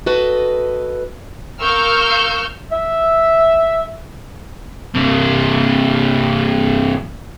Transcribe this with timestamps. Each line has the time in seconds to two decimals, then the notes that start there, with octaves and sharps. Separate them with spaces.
0.06 F#4 A4 B4 D#5
1.61 A#4 F5 C#6 E6 F6 G6
2.71 E5
4.95 G2 C3